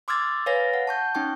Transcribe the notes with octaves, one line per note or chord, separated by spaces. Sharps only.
C6 D6 E6 F6 G#6 A6
B4 C#5 F5 G#5 A6 A#6
F#5
A5 C#6 G6
C#4 D#4 G5 C#6